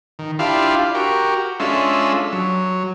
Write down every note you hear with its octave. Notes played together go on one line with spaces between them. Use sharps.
D#3
D4 E4 F4 G4 F5
F#4 G4 A#4
G#3 C#4 D4 F4 A4 E5
F#3